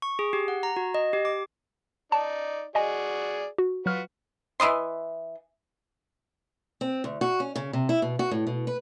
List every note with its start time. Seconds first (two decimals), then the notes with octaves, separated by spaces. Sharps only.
0.02 C#6
0.19 G#4
0.33 G4
0.48 F#5
0.63 A#5
0.76 F#4
0.94 D#5
1.13 G4
1.25 D6
2.12 D#4 D5 A5
2.75 F#4 G#4 D5 D#5 G#5
3.58 F#4
3.86 F#3 F4 F#4 B4 F6
4.60 E3 E4 D#5 C6
6.81 C4
7.04 D2
7.21 F#4
7.40 C#4
7.56 C#3
7.73 C3
7.89 E4
8.02 B2
8.19 F#4
8.31 A2
8.47 B2
8.67 B4